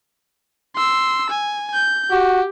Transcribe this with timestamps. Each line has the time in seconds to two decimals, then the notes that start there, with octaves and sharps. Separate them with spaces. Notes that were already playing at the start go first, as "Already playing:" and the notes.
0.76 C6 E6
1.30 G#5
1.74 G6
2.11 F#4 G4